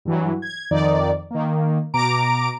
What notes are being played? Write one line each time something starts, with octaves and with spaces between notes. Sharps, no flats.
G2 E3 F#3
G#6
F2 D#3 D#4 D5
D#3 A#3
B2 A#5 D6 D7